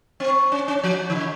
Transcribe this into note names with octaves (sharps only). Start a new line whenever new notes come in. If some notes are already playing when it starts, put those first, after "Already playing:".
C4
C#4
C#4
F3
D#3
C#3